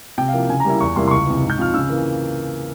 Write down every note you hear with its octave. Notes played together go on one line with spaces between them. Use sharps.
C3 G5
F5
F3 A#3 E4
C#3 G#5
A#5
G3 A#3 E4
E2 C#6
C3 G3 A#3 E4 C6
C6
C#2 C#6
C3 E3
G#2
G6
F3 C4 F4 F6
C#3 E6
E3 A#3